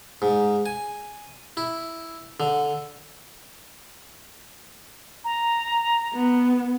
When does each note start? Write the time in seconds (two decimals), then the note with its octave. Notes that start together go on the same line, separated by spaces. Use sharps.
0.22 G#2
0.66 G#5
1.57 E4
2.40 D3
5.24 A#5
6.14 B3